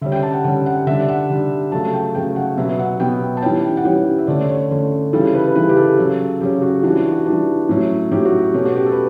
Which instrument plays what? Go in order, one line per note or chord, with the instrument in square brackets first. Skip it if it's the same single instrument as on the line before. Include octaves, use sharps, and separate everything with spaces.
[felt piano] D3 G3 C#4 E5
G5
A5
F#5
D3 G3 C#4 F#5
F#5
D3 G3 D4 E5
F#5
D3 G3 D4
C#3 F#3 A3 A5
G5
C#3 F#3 A3 G5
F#5
B2 F#3 B3 E5
F#5
B2 F#3 B3 G5
A5
E3 G3 C#4 G5
F#5
E3 G3 C#4 G5
E5
D3 A3 C#4 D5
C#5
D3 A3 C#4
C#3 E3 G3 A4
B4
C#3 E3 G3 B4
G4
A4
C#3 F#3 C#4
C#3 F#3 C#4 G4
F#4
E3 G3 D4 F#4
F#4
E3 G3 D4
A2 F#3 C#4
A2 F#3 C#4 G4
F#4
G4
B2 A3 C#4 G4
F#4
G4
A4
B4